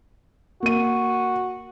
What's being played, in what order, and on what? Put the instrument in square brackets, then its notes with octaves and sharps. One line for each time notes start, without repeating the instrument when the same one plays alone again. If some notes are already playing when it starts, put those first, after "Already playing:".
[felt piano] A#3 D#7 [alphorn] F#4